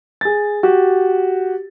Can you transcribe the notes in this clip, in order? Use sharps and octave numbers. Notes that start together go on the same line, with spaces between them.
G#4 A6
F#4 G4